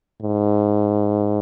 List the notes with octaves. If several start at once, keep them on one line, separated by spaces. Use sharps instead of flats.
G#2